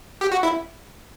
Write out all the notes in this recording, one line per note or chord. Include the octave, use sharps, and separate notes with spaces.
G4
F#4
E4